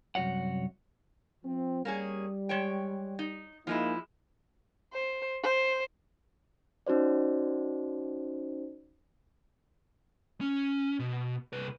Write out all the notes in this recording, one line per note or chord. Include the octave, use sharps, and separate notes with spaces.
C2 F#2 F#4 C#5 F#5
F3 C4
G3 A#3 C#4 G#4
G#3 C#5 G5
D#4
F3 G#3 A#3 D#4 E4 G#4
C5
C5
C#4 D#4 F#4 C5 D5
C#4
B2
C2 B4